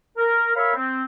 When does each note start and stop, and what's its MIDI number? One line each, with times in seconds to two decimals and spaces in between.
0.18 0.51 70
0.56 0.75 70
0.56 0.75 73
0.56 0.75 76
0.56 0.75 77
0.56 0.75 83
0.75 1.03 60